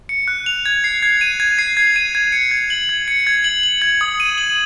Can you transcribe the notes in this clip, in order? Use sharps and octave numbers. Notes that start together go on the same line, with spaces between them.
C#7
F#6
F7
G#6
C7
G#6
D#7
G#6
C7
G#6
D#7
G#6
C#7
G#6
F#7
G#6
C#7
G#6
F#7
F#7
G#6
D#6
D#7
F#7